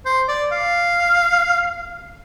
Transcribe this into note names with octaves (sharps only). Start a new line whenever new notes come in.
C5
D5
F5